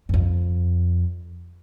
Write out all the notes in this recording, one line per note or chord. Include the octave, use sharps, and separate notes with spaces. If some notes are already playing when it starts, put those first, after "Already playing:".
G2
F2